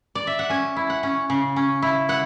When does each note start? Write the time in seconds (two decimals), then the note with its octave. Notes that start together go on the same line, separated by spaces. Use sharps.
0.15 D5
0.27 E5
0.39 F#5
0.49 C#4 G#5
0.76 E4
0.90 F#5
1.03 C#4
1.30 C#3
1.56 C#4
1.82 E4
2.09 E4 F#5